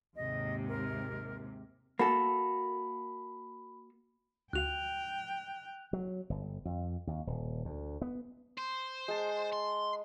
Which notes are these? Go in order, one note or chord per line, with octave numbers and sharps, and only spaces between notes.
D#2 G#2 C3 D#5
A#4
A#3 F#4 A4 B5
D2 F#4 F5 G5 F#6 F7
F#3
G1
F2
D#2
D#1
D2
B3
C5
G#3 A5
C6